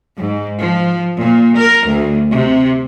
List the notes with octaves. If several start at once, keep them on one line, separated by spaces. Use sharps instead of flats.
G#2
F3
A#2
A#4
D2
C3